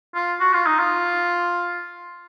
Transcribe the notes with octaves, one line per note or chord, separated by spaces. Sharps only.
F4
F#4
F4
D#4
F4